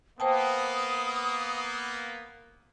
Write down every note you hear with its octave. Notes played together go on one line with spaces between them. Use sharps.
A#3 B3 C5 G5 A5 D#6